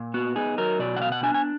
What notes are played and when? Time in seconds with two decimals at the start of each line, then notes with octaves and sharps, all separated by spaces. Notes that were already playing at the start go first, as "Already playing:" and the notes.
Already playing: A#2
0.14 B3 F#4
0.36 D#4 G#4
0.58 F#3 A#4
0.79 B2 D5
0.96 F#5
1.01 B3 F5
1.12 F#5
1.23 D4 G#5
1.34 G#5